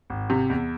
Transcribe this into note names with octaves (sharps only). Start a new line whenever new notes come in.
G#1
C3
E2